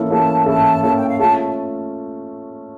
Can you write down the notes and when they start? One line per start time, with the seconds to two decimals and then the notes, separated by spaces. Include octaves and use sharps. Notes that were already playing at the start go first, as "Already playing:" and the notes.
Already playing: E3 A#3 C#4 E4 A4
0.10 E3 A#3 C#4 E4 A4 A5
0.46 E3 A#3 C#4 E4 A4 A5
0.82 E3 A#3 C#4 E4 A4 A5
0.95 G5
1.07 F5
1.19 A3 C#4 F4 A5